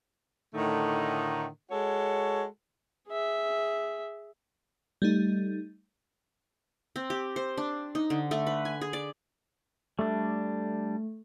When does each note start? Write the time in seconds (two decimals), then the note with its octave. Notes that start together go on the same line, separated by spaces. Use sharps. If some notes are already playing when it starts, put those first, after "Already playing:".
0.54 A2 D3 D#3 A3 D#4
1.71 G#3 F#4 A4 C#5
3.08 G#4 E5
5.02 G3 A3 D#4
6.96 C4
7.10 G4
7.36 C5
7.57 D4
7.95 D#4
8.10 D3
8.31 A3
8.47 B4
8.65 G#5
8.81 G#4
8.93 D5
9.99 G3 A3 D4